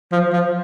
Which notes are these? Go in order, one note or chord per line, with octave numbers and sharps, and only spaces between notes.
F3
F3